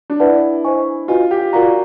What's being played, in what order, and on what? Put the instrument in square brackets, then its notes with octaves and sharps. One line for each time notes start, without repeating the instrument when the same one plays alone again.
[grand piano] D4
[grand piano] E4 [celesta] B4 D5 F#5 A5
[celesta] C5 D#5 G#5 C#6
[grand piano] F4 [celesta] F#4 B4 D#5 G#5
[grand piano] G4
[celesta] F4 A#4 D5 F5 A#5 [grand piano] F#4